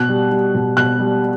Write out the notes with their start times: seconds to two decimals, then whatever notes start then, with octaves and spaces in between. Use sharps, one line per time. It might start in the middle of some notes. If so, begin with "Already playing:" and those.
Already playing: B2 F#6
0.09 G3
0.31 G3
0.54 B2
0.77 B2 F#6
0.99 G3